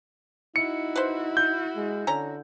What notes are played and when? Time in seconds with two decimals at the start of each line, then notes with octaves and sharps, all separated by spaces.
0.56 D#4 E4 F#4 C#7
0.96 B4 C5
1.37 G6
1.76 G#3
2.07 D3 C#4 A#5